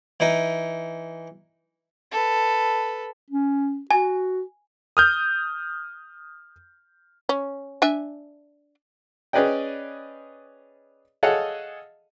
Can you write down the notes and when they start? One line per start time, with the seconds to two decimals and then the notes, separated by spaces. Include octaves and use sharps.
0.20 E3 D#4
2.12 A4 B4
3.30 C#4
3.91 F#4 G#5
4.97 D#6 F6 G6
7.29 C#4
7.82 D4 E5 G#5
9.33 C#4 G#4 B4 D5 D#5 G5
11.23 G#4 A4 C#5 D#5 F5 F#5